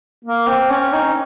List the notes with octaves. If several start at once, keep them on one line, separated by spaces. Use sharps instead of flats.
A#3
C4
C#4
D#4